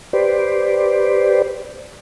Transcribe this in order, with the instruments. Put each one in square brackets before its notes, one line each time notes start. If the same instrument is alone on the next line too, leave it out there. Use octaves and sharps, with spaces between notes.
[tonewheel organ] G4 B4 C5 D5